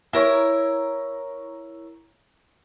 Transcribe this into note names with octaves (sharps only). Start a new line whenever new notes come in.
E4 A#4 C#5